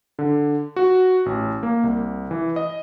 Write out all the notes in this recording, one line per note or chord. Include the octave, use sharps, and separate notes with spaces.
D3
F#4
A1
A#3
C2
E3
D#5